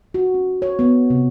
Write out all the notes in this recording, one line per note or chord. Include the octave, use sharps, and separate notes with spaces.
F#4
C#4
C#5
B3
C3